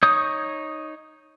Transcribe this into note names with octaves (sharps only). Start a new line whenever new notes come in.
D#4 C#5 C#6 D#6 G6